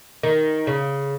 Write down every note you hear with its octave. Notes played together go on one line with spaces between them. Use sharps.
D#3
C#3